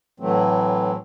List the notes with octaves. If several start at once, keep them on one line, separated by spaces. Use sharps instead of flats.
A2 E3 F#3 A3 C4